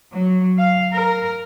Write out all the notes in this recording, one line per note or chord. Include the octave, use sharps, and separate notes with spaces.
F#3
F5
A#4